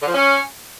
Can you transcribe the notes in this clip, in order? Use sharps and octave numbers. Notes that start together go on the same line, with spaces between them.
D3
F3
C#4